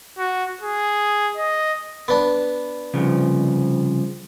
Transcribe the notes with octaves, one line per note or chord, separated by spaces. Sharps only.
F#4
G#4
D#5
B3 D4
C2 C#3 F3